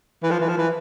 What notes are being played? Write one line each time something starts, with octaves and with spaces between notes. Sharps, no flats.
E3
F3
E3
F3
E3